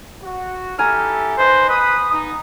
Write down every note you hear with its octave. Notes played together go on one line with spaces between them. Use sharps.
F#4
E4 G4 A4 G#5 A#5 F6
D#4 B4 C5 D#5
B4 B5 D#6
B3 D#4 D#6